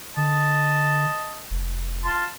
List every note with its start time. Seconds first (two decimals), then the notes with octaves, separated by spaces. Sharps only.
0.17 D3 D#5 A5
1.50 F1
2.05 F4 A5 C6